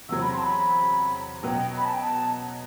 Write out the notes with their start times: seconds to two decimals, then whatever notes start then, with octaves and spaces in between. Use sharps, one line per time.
0.09 E2 C3 F#3 C4 E6
0.21 B5
0.32 C6
0.38 A5
0.43 B5
1.43 B2 F#3 B3 G5
1.76 B5
1.84 A5
1.93 G5
2.02 A5